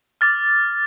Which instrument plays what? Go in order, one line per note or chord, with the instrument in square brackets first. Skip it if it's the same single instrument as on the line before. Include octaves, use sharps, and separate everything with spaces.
[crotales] D6 F6 A6